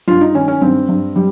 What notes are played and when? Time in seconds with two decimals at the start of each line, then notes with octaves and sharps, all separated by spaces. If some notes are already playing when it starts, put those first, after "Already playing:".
0.08 G2 F4
0.21 D#4
0.35 D#3 C#4
0.48 C#4
0.61 G2 C4
0.89 G2
1.16 G3